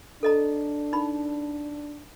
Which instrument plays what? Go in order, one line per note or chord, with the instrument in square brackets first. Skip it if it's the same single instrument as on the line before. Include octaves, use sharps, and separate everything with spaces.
[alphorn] D4 [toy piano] A4 D#5 A#5
[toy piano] D#4 B5